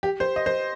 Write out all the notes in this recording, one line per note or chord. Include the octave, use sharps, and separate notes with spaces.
G4
C5
D#5
C5